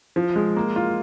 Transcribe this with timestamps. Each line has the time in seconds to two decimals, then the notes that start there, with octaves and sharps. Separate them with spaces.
0.16 F3
0.36 G#3
0.57 A#3
0.76 F4